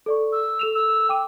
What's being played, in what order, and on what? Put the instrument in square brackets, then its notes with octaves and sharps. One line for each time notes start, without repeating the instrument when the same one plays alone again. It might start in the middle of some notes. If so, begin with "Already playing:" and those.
[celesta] A4 D5 C#6
[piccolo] E6
[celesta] A4 E7 F7
[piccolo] E6
[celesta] G5 D6 D#7